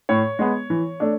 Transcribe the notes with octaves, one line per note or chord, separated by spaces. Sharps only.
A2 C#5
G#3 B3
E3
A3 D4